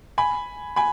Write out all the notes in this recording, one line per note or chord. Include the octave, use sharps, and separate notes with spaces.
G#5 B5
G#5 B5